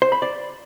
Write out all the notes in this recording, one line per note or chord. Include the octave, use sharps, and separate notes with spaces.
C5
B5
D5